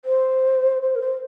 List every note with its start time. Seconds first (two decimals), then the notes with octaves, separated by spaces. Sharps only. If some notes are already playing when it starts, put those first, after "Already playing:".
0.05 C5
0.82 C5
0.95 A#4
1.01 C5